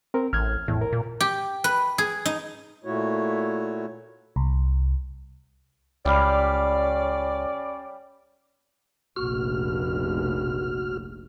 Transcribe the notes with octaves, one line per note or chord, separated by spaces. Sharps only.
C4 A#4
A1 F6 G#6
E2 A2
A#4
A#2
G4
B4
G#4
D#4
A#2 A3 E4 F#4 C#5
C2
C#2 G3 C#4 D5 F5 B5
F1 A#1 F#4 F6